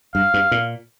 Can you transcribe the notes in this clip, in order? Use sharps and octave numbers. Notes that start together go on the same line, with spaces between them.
G2 F5
G2
A#2